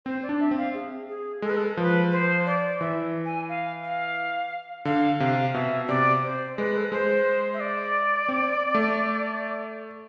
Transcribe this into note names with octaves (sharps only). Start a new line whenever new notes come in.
C4 C5
D5
D4
E5
C4
F5
G#4
G#4
G#3 A4
B4
A4
F3 B4
C5
D5
E3 E5
G#5
F5
F5
D3 F5
C3 F5
B2 E5
C3 D5
C5
G#3 B4
A4
B4
G#3 C5
E5
D5
C4
A3